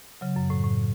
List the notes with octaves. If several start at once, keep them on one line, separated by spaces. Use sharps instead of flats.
C#3 F#3
F#2
A2
A2